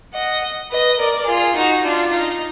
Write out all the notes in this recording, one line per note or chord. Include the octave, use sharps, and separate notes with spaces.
D#5 F#5
B4 D#5
A#4 D5
F4 G#4
D#4 F#4
D4 F4
D#4